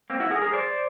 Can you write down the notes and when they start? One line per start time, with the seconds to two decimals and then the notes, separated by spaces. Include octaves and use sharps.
0.10 A#3 C4
0.20 E4 F#4
0.31 G#4 A#4
0.42 G#4 A#4
0.53 C5 D5